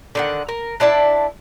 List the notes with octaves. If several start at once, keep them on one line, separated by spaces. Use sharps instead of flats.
D3 D#3 F#5
A#4
D4 E4 D5 A5